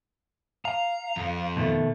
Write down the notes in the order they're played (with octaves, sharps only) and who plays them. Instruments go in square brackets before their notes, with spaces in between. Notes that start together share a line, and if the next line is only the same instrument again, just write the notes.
[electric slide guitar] F5 [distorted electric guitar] A#5
[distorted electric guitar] F2
[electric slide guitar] B2 D#3 A3